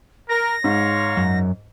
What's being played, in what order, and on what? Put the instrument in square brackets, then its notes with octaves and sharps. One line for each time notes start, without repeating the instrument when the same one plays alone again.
[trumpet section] A#4 [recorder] A#6
[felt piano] G#2 [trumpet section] C#5 F5 C6
[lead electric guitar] F#2